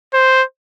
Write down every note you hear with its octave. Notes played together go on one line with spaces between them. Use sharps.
C5